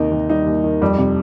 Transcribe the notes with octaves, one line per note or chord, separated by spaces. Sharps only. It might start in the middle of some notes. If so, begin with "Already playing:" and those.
Already playing: D#2 C3 D#3 D#4
D#2
G3 D#4
D#2
D#3
F2 G3
C3